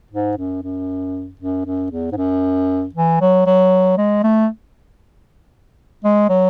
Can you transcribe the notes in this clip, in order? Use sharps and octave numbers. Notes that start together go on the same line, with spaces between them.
G#2
F#2
F#2
F#2
F#2
E2
G#2
F#2
E3
F#3
F#3
G#3
A3
G#3
F#3